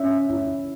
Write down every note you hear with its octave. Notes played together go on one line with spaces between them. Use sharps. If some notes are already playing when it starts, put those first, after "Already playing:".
Already playing: C#4 E5
E4